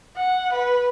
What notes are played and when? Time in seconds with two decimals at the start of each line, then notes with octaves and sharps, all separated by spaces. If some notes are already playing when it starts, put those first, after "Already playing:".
0.16 F#5
0.52 B4